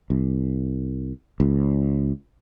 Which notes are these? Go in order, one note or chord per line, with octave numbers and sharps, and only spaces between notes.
C2
C#2